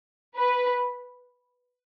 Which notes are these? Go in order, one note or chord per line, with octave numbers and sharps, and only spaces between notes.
B4